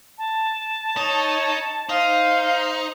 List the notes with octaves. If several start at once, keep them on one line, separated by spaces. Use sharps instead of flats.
A5
D#4 C#5
D#4 C5 F5